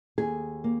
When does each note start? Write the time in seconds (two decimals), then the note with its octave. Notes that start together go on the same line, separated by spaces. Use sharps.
0.18 D#2 G#4
0.64 A#3